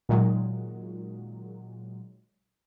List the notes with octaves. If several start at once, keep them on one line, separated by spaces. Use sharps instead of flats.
A#2 D#3 F#3 G#3